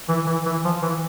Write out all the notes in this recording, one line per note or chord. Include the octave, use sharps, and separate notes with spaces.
E3
E3
E3
F3
E3